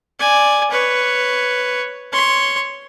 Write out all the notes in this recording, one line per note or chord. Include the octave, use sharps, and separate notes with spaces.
D5 G#5
B4 C#5
C#5 C6